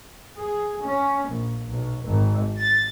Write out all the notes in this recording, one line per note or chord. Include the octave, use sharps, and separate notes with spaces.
G#4
C#4
A#1
B1
G#1
A6